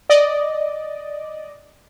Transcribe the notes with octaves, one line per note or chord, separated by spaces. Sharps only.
D5 D#5